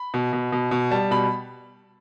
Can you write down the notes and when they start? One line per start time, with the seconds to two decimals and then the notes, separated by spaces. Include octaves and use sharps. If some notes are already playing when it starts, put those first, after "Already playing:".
Already playing: B5
0.14 B2
0.33 B2
0.52 B2
0.71 B2
0.91 G3 A5
1.11 B2 B5